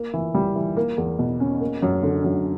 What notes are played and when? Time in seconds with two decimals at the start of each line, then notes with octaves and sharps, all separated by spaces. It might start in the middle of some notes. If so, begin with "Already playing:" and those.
Already playing: A#3
0.14 E3
0.34 G3
0.56 E3
0.77 A#3
0.98 E2
1.19 B2
1.40 C#4
1.60 A#3
1.82 F#2
2.03 D3
2.24 F#2